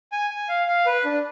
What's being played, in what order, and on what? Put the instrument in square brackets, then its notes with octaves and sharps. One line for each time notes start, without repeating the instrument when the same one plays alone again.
[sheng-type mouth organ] G#5
G#5
F5
F5
B4
D4